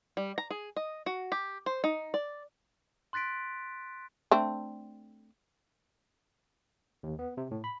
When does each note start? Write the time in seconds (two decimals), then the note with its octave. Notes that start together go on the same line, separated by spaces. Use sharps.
0.17 G3
0.38 A#5
0.50 G#4
0.76 D#5
1.06 F#4
1.32 G4
1.66 C5
1.84 D#4
2.14 D5
3.13 C6 F#6 A6 B6 D7
4.31 A3 C4 D4
7.03 D#2
7.19 B3
7.37 C3
7.51 A2
7.64 B5